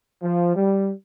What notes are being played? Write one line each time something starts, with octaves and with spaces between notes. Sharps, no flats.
F3
G3